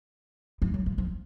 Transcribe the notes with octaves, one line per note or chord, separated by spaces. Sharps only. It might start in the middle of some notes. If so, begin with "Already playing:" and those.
F3
F#3
F3
F3